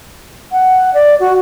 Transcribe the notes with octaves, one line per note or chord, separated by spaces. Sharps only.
F#5
D5
F#4